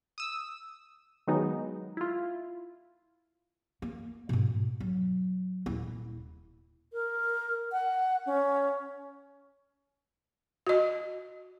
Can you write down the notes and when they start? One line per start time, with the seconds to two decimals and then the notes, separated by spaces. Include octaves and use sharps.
0.18 D#6 E6
1.27 D#3 F#3 G#3 B3 D#4
1.97 E4 F4
3.82 A#3
4.29 G#2 B2
4.80 F#3
5.66 D#1 E4
6.93 A#4
7.72 F#5
8.26 C#4
10.67 F#4 D#5